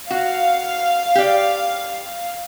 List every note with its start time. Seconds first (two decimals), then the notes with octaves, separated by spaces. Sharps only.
0.11 F#4 F5
1.15 G4 D5